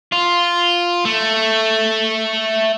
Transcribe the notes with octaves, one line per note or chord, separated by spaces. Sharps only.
F4
A3